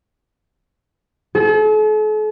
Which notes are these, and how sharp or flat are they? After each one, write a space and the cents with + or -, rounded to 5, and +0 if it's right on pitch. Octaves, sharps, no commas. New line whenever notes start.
A4 -45